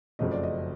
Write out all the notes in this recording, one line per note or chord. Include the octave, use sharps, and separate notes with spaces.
F#1 F2 C#3 F#3 A3 D#5
D5
D#5